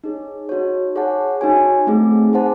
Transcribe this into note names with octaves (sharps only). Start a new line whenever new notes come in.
D#4 G#4 C#5
D#4 F#4 C#5
G#4 C#5 F#5 A5
D#4 F#4 C#5 G#5
A3 C4 D#4 G#4
G#4 C5 F#5 A5